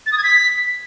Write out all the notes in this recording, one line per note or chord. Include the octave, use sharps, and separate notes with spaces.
A6
D#6
G#6
B6